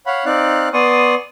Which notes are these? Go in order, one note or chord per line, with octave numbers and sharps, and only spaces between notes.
C#5 F5 F#5 B5
C4 D#4 D5 F5 F#6
B3 D5 G#5 C6 C#6 D#6